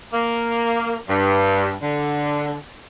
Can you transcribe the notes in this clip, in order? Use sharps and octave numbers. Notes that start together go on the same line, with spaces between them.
A#3
G2
D3